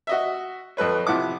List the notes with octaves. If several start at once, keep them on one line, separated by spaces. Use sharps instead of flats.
F#4 D#5 E5
F2 A4 B4 C#5
C3 F3 E4 F#5 D6